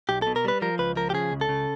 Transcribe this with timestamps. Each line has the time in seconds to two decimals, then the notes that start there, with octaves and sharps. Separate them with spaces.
0.09 B1 G4
0.22 A4
0.27 B2
0.36 A#4
0.45 G3 B4
0.62 F3 A#4
0.79 C#2 B4
0.96 F3 A#4
1.10 G4
1.14 C#3 G#4
1.32 C#2
1.41 A4
1.49 C#3